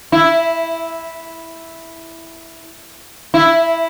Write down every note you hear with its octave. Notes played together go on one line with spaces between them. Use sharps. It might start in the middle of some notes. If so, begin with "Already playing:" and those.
E4
E4